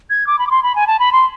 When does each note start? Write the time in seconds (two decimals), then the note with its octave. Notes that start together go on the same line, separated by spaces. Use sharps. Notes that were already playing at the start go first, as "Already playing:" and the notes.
0.10 G#6
0.27 D6
0.39 B5
0.47 D6
0.51 C6
0.63 B5
0.76 G#5
0.87 A5
0.99 B5
1.12 C6